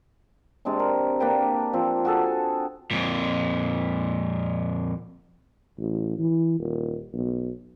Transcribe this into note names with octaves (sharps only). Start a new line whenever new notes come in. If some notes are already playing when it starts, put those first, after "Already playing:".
C3 G#3 D4
A#4
A#3 D4 B4 G5
F3 C4
F#4 G#4 A4 G#5
F2 A#2
A1
E3
D#1
B1